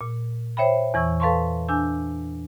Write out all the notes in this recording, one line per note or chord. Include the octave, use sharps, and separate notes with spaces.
A#2
C5 C#5 E5 G5 B5
E2 E3 C#6 E6
A4 B4 F5 A5 C6 C#6
D4 G#5 E6 G6